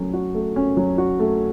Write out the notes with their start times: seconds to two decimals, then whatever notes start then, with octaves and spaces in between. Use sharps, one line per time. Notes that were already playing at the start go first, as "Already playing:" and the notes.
Already playing: F#3 A3 C#4 F#4
0.14 F#4
0.34 A3
0.56 C#4
0.77 F#3
0.98 F#4
1.20 A3